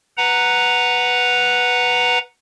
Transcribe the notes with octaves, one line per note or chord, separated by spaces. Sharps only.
B4 F#5 A#5